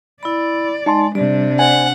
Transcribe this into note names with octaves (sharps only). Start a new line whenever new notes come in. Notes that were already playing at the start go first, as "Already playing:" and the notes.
E4 D5 B5
G#3 D#4 A5 C6
C3 G3 D4 D5
C5 F#5 G#5